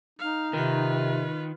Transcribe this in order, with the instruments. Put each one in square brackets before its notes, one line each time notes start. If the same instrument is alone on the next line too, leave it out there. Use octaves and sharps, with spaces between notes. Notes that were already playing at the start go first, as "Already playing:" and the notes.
[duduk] D#4 [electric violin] F5
[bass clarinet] C3 [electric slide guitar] D#3 [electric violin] F4 B4